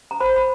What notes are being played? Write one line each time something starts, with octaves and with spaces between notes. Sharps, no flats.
A#5
C5 B5
B5